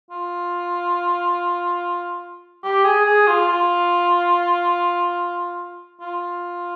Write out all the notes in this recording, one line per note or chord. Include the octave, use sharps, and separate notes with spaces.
F4
G4
G#4
G#4
F4
F4
F4